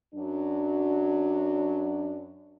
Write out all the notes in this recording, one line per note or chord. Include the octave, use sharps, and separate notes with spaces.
F#2 F#3 D4